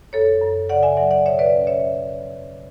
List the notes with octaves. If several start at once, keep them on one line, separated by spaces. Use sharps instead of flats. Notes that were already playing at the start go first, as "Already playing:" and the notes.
F#2 A4 C#5
F#2
C#3 D5 F#5
E5 G#5
F#3 D5 F#5
D5 F#5
B2 C#5 E5
B4 D5
C#4
C#5 E5